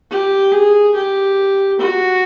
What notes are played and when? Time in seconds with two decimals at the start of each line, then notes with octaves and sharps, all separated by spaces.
0.10 G4
0.52 G#4
0.95 G4
1.79 F#4